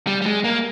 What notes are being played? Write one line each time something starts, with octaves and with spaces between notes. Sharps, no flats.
G3
G3
G#3
A#3